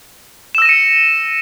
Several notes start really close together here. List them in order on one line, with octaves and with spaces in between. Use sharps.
E7 E6 A#6 D#7 C#7